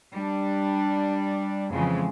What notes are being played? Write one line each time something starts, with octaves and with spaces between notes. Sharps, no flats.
G3 D4
F2 C#3 E3 F3 G#3